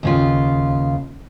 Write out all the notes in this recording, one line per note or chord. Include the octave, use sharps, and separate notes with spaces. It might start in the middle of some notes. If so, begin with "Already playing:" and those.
D#2 C#3 F4